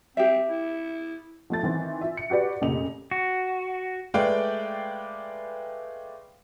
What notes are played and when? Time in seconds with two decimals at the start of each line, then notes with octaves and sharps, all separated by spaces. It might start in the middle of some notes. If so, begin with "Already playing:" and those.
0.17 C4 G4 E5
0.49 E4
1.50 F3 A3 A6
1.63 D#3 E3 C4
2.01 F4 E5
2.17 C#7
2.30 F#4 G4 B4 D5
2.61 F1 A#2 C#3 G4 D#5 F7
3.11 F#4
4.14 G#3 A3 B4 D5 F5 G5